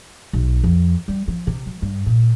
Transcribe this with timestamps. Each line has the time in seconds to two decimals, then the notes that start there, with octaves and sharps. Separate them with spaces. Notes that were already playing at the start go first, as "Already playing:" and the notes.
0.33 B1
0.64 F2
1.08 G3
1.28 F3
1.47 C3
1.66 F#3
1.82 G2
2.06 A#2